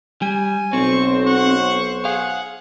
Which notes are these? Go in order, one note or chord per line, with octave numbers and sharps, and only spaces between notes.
G3 G#5
B1 C4 C5 C#6
F#5 C#6
G#4 F5 F#5